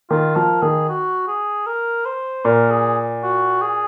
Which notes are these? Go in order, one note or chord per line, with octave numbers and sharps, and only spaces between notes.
D#3 F4
F3 A#4
D#3 G#4
F#4
G#4
A#4
C5
A#2 A#4
G#4
F#4
G#4